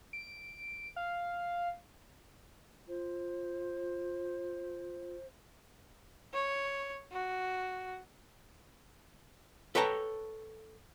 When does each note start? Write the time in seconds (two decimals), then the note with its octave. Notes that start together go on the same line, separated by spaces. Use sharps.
0.13 D7
0.96 F5
2.88 F4 C5
6.34 C#5
7.12 F#4
9.75 A4 B4 C#5 G5 A5 A#5